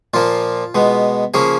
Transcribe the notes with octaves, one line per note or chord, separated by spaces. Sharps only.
A#2 F3 A#3 F4
B2 G#3 B3
C#3 F3 A#3 C#4 G#4